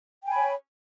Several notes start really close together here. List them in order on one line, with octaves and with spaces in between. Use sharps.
G5 G#5 B5 C#5